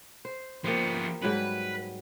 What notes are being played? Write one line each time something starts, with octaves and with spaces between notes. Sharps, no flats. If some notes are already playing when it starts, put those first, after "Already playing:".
C5
F3 A#3 B3 G4 C5
G#2 F#3 G3 B4